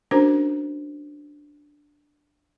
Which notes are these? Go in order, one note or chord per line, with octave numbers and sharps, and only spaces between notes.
C#4 D4 F#4 A#4 C5 A#5